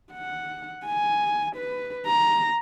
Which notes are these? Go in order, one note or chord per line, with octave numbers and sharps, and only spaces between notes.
F#5
G#5
B4
A#5